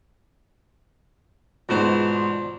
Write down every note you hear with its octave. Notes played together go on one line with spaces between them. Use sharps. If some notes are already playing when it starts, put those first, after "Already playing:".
E2 G#2 B2 D4 F4 C5 E7